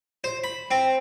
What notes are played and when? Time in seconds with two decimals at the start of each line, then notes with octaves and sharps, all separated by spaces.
0.24 C5
0.44 B5
0.71 C4